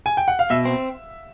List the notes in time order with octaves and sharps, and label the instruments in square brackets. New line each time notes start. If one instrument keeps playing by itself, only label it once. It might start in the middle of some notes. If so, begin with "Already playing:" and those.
[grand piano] G#5
G5
F#5
F5
[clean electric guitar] B2 [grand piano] E5
[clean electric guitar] C4